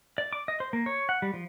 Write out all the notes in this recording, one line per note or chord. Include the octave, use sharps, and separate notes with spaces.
D5
D6
D#5
C5
A#3
C#5
F#5
G3
F3